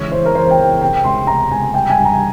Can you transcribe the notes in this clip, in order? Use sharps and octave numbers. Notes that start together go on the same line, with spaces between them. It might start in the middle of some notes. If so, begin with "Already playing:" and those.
Already playing: C#2 E3 C#5
E3 C5
A#4
E3 C5
G5
E3
C3 G5
C#2 C6
C3 A#5
C#2 G#5
G3 G5
G#5
G2
A#5